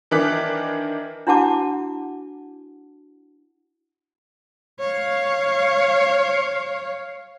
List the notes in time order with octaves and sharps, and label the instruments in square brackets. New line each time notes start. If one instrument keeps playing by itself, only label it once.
[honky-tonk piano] D#3 E3 D4 D6 F#6 B6
[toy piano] D4 E4 F#4 F#5 A5 D6
[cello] C#5 F5